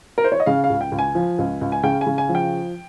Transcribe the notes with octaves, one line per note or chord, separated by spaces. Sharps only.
A#4
C5
C#5
D#5
C#3 F5
F5
C#2
G5
C#2
G#5
F3
C#2
C#2
G#5
C#3 G5
G#5
C#3
G#5
F3
G5